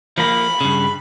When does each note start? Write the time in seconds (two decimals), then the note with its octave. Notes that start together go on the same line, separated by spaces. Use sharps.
0.18 F3 A#3 B5
0.61 G2 C#3